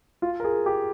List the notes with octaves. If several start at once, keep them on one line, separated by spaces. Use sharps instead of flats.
F4
A#4
G#4
G4